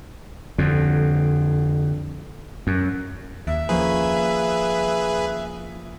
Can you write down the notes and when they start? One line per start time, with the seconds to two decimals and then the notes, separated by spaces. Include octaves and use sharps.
0.58 F2 D3
2.67 F#2
3.47 D#2 E5
3.69 F3 A#3 C#4 G#4 B4